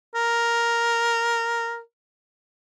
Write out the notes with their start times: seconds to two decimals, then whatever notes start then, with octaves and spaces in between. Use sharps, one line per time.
0.15 A#4